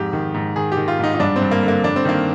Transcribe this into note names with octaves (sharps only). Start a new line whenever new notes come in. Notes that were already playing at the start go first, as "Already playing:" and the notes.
Already playing: F2 G#2 G4
D#3
G#2
D#3 G#4
G4
D#3
F4
G#2 D#4
D#4
G2 D4
C4
G2
A#3
D3
A#3
G2 D4
C4
D#3 A#3